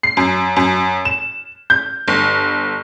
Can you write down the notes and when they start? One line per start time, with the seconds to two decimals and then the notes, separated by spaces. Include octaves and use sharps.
0.03 C7
0.17 F#2
0.56 F#2
1.05 E7
1.70 G6
2.08 G1